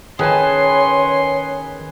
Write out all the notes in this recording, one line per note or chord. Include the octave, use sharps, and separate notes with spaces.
D#3 C#4 G#4 B4 C#5 G#5 A5 C6